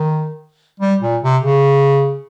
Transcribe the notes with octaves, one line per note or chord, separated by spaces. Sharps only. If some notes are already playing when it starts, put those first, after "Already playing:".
Already playing: D#3
G3
A#2
C3
C#3